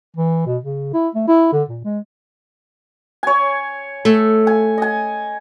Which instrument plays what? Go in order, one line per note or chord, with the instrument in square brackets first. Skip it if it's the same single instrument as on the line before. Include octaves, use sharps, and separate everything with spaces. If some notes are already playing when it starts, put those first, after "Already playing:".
[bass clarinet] E3
B2
C#3
E4
A3
E4
D3
A#2
G#3
[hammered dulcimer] C#5 G#5
[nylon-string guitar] A3
[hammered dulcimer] G#5
D#5 G#5